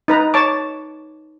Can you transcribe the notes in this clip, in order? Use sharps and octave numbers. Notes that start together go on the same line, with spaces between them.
D#4 B4 A#5
C#5 A5 D6